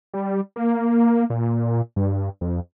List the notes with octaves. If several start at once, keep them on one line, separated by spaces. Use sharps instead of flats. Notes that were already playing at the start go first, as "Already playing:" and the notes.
G3
A#3
A#2
G2
F2